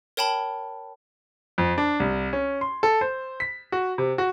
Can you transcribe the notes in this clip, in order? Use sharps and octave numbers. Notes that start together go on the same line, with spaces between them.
A#4 C#5 G5 A5 B5
F2
D4
C2
C#4
C6
A4
C5
B6
F#4
C3
F#4